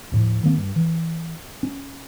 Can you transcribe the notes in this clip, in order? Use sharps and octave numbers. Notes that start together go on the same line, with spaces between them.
D#2 A2 F3
D#3 A#3 C4
G2
E3
C#4